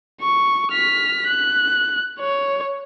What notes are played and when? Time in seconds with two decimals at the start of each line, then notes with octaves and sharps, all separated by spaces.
0.21 C#6
0.71 F6 B6
1.27 F#6
2.20 C#5